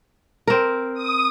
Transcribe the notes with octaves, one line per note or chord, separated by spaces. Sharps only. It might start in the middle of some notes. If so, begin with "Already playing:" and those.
C4 A#4
D#6